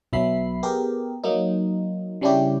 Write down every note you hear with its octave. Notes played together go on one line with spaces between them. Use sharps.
B1 F#3 B3 E5 B5 C7
B3 G4 G#4 A#4
F#3 A#3 D#4
C#3 G3 C#4 D4 E4 G4